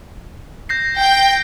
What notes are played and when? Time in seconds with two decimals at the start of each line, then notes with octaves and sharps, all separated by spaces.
0.69 G6 A#6 C7
0.98 G5